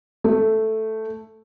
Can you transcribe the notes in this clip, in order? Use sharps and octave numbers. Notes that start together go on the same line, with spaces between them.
A3